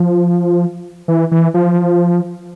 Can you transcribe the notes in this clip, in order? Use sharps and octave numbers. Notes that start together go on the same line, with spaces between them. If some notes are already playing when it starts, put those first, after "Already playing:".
Already playing: F3
E3
E3
F3